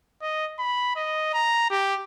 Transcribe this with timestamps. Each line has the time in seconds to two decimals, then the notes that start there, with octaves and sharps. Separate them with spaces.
0.22 D#5
0.59 B5
0.96 D#5
1.34 A#5
1.70 G4